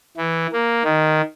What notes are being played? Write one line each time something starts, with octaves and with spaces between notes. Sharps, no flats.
E3
A#3
D#3